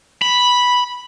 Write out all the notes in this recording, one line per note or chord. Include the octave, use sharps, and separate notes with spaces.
B5